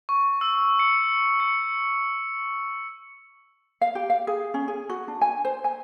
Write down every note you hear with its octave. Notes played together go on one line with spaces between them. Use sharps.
C#6
E6
C#7
C#7
F5
G4
F5
G#4
C#4
G#4
F#4
D4
G#5
C5
G#5